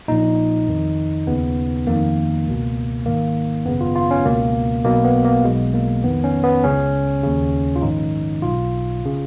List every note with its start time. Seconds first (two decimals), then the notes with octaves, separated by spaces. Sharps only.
0.08 A#1 A#2 D#4
0.68 F2 D#3
1.27 D#2 C#3 B3
1.87 F2 D#3 A#3
2.46 C#2 B2
3.06 G#1 G#2 D#3 A#3
3.65 G#1 F#2 C#3 B3
3.81 F4
3.95 F4
4.11 C#4
4.25 C#2 B2 A#3
4.85 B1 B2 A#3
5.04 B3
5.25 A#3
5.44 B1 B2 G#3
5.74 A#3
6.04 F2 D#3 B3
6.24 C#4
6.44 B3
6.64 C#2 C#3 C#4
7.23 D#2 C#3
7.76 F4
7.82 A#1 G#2 D#3 D#4
8.42 B1 B2 F4
9.06 C#3